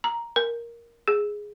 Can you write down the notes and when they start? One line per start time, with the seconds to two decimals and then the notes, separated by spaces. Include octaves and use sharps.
0.04 A#5
0.36 A#4
1.08 G#4